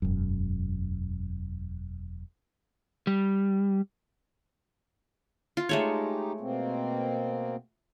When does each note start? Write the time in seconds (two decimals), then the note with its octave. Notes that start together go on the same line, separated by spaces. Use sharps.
0.02 E1 F#2
3.07 G3
5.57 F4
5.69 G#3 A3 D#4 G4 C#5
6.40 B2 A#3 C4